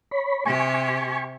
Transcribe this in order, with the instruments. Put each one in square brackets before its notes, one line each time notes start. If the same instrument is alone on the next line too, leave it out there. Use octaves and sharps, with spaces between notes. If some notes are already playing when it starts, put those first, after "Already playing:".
[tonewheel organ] C#5 B5
[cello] C3 G4 [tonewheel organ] G#5 C#6